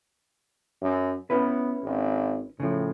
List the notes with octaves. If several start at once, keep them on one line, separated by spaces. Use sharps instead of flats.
F#2
B3 C#4 E4 B4
G#1
A2 C#3 F3